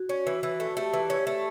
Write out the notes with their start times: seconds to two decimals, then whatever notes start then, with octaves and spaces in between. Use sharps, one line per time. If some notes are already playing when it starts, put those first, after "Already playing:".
Already playing: F#4
0.09 C#4
0.27 E3
0.43 E3
0.60 A3
0.77 A3 G4
0.93 E3
1.10 C#4
1.27 A3